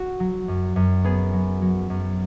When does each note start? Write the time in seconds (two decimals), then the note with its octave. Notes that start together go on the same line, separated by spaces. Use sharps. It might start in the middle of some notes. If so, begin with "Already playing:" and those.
Already playing: F#4
0.20 F#3
0.48 F#2
0.76 F#2
1.04 B3 G#4
1.33 F#3
1.62 F#3
1.90 F#2